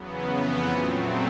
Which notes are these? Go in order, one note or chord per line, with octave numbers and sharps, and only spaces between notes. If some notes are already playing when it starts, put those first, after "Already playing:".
Already playing: E2 C#3 F#3 B3
F2 C#3 E3
A#2 F#3 A3 C4